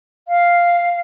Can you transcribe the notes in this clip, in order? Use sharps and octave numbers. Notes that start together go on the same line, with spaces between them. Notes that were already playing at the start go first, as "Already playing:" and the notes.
F5